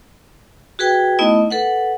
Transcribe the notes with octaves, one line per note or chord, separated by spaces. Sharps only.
F#4 G#4 B4 G5
A3 B3 D#4 E4 D#5
A4 B4 F#5